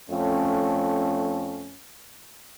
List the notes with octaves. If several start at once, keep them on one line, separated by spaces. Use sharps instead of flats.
F2 A3 C#4